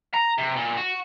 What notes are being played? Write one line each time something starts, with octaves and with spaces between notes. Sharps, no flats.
A#5
C3
A#2
F#4